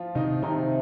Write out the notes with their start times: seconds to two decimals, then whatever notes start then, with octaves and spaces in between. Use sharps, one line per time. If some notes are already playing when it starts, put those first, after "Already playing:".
Already playing: F3 F4
0.15 C3 D#3 D#4
0.42 C3 D#3 D#4